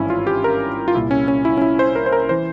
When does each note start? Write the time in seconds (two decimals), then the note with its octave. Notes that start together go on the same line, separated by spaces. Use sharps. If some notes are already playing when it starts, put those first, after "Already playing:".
Already playing: G#1 G2 E3 C#4 E4
0.10 F4
0.27 G4
0.44 A#4
0.88 F4
0.95 C2 A#2 E4
1.11 C#4
1.28 C#4
1.45 E4
1.57 C#4
1.62 E4
1.79 C5
1.96 A#4
2.06 C5
2.12 A#4
2.29 E3 C5